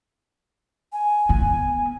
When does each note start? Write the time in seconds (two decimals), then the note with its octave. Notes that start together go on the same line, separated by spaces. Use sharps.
0.93 G#5
1.29 B3